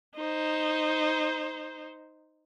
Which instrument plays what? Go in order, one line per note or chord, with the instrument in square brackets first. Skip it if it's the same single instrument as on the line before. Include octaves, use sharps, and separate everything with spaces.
[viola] D#4 C5